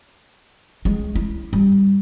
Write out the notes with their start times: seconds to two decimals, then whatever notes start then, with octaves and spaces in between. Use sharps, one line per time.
0.85 G#3
1.15 E4
1.53 G3